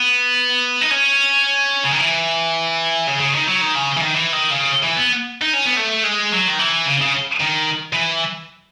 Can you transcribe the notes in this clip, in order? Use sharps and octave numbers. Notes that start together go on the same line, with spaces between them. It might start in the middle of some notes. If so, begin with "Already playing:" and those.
Already playing: B3
D#4
C#4
C#3
D#3
E3
C#3
C#3
D#3
F#3
D#3
C#3
E3
D#3
E3
D#3
C#3
E3
B3
D#4
C#4
B3
A3
G#3
F#3
D#3
E3
C#3
C#3
D#3
E3